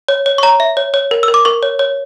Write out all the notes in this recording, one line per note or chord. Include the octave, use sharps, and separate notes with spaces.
C#5
C#5
C#6
C#5 A#5
E5
C#5
C#5
A#4
E6
A#4
D6
A#4 C#6
C#5
C#5